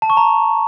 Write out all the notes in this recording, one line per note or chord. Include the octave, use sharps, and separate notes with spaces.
A5
C#6
A#5